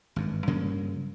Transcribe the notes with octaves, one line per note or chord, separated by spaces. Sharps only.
G#1 G2
G2 C#3 F#3 A#3